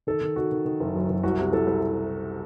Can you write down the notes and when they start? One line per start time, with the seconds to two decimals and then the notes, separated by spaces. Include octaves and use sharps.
0.07 D#3 A4
0.21 D#3
0.36 D#3 F#4
0.52 D#3
0.65 D#3
0.80 F#1
0.95 F#2
1.10 F#1
1.23 C2 F#4
1.39 C3
1.52 C2 A4
1.67 C2